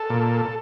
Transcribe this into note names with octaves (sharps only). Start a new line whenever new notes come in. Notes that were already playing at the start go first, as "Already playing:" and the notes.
Already playing: A4
A#2